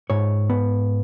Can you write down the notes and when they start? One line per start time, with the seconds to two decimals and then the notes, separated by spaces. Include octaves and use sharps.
0.10 G#2 C#5
0.50 B3